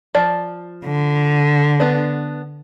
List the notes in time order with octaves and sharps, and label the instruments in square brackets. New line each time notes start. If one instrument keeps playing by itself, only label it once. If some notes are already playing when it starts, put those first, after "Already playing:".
[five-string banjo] F3 D5
[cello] D3
[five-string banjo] B3 D4